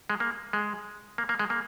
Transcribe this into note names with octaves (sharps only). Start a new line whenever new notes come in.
G#3
A#3
G#3
A#3
A#3
G#3
A#3